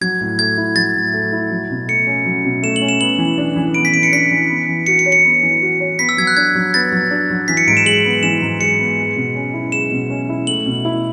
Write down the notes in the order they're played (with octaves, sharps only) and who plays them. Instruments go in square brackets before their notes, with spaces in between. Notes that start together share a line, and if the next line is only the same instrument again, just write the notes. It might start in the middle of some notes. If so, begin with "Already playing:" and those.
[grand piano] F#3 [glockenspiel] G#6
[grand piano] A2
[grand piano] A3 [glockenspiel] G#6
[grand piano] E4
[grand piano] F#3 [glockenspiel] A6
[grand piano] A2
A3
E4
F#3
B2
[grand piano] A3 [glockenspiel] C#7
[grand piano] C#4
F#3
B2
[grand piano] A3 [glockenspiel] E7
[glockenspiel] F#7
[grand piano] C#4
[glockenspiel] E7
[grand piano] B3 [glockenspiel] F#7
[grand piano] E3
D4
E3
[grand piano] B3 [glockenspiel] D7
[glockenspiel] B6
[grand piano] E3 [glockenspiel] D7
[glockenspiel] C#7
[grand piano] D4 [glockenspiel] B6
[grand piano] E3
B3
E3
[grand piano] F#4 [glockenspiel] C#7
[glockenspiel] C#7
[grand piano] C#5
[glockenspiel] C#7
[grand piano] B3
E3
F#4
C#5
[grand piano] B3 [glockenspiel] B6
[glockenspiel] E6
[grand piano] F#3 [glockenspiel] G#6
[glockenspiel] F#6
[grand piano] D4 [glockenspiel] G#6
[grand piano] F#3
[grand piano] B3 [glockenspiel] A6
[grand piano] F#3
D4
F#3
[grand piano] E3 [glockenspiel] B6
[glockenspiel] C#7
[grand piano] G#2 [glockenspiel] D7
[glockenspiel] E7
[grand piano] G#3 [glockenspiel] F#7
[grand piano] B3
[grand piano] E3 [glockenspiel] E7
[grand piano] G#2
[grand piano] G#3 [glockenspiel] C#7
[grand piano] B3
G#3
B2
C#4
E4
[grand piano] G#3 [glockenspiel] E7
[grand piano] B2
C#4
E4
[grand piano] A3 [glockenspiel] F#7
[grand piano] B2
E4